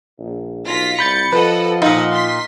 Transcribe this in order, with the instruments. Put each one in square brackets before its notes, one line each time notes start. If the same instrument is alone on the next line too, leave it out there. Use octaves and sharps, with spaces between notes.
[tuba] A#1
[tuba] B1 [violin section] F4 A#6 B6
[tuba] C2 [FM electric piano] B5 G6 A6 [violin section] C#7
[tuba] F3 [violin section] A4 D#5 F#5 [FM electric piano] B4
[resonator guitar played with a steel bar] A#2 D#4 [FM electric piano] F4 [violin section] F#5
[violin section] C6 B6